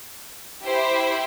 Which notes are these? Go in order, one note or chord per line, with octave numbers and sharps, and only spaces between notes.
E4 G4 C5 E5